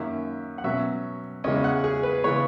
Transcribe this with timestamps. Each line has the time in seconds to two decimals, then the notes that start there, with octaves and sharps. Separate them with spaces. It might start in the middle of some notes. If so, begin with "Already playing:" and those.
Already playing: F#2 D#3 A#3 C#4 E5
0.58 F#5
0.64 B2 F#3 C#4 E5
1.44 E2 C#3 G#3 C#4 D#5
1.64 F#5
1.84 G#4
2.03 B4
2.24 C#3 E3 G#3 B3 C#5